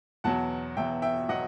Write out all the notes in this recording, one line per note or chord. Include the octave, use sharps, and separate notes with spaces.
E2 B2 F#3 F#5 A5
E2 B2 F#3 E5 G5
E5 G5
B2 F#3 D#5 F#5